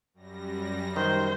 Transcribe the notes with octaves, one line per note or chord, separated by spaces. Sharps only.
F#2 G3 A#6
D#3 C5